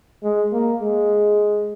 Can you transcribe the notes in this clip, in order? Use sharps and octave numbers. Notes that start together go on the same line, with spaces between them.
G#3
A#3
G#3